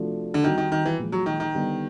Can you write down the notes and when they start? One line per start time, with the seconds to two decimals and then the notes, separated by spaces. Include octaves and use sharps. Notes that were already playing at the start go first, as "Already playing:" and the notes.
Already playing: C3 F3 A3 D4 F#4
0.34 D3
0.44 D#3 G3 C4 D#4 F#4
0.58 D#3
0.72 D#3
0.86 E3
0.99 A#2 F3 G#3
1.12 F#3
1.26 D#3
1.40 D#3
1.53 D3 G3 B3 D#4